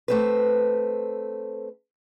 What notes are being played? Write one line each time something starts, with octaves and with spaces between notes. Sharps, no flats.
A3 C4 B4